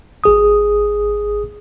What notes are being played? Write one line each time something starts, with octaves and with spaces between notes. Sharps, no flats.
G#1 G#4 D#6